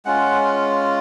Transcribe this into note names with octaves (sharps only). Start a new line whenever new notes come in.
G#3 C#4 F4 F#5